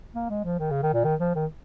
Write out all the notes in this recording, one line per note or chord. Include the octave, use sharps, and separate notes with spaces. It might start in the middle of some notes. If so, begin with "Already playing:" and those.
A#3
G#3
F3
D#3
C#3
D#3
A#2
D#3
F3
D#3